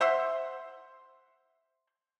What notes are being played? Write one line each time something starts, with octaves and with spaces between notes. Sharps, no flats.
C5 E5 F#5 C6